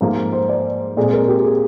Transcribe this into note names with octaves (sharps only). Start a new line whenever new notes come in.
G#2 F3 A#3 G#4
C5
D5
A#2 G#3 C4 D5
A#4
G4
G#4